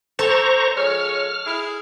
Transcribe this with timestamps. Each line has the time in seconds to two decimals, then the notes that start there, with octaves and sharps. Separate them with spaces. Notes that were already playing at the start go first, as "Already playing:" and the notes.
0.19 A4 C5 A#5 C#6
0.77 F3 G#3 C#5 F6
1.45 E4 G#4